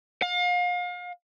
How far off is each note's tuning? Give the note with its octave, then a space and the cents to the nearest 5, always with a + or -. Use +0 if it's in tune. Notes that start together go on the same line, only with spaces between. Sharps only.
F5 +35